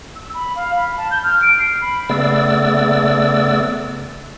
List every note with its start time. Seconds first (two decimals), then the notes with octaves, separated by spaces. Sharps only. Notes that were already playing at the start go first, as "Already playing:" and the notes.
0.15 E6
0.33 B5
0.55 F5
0.76 B5
0.97 A5
1.10 G6
1.23 F6
1.42 D7
1.58 C7
1.81 B5
2.09 C#3 A3 B3 D5 E6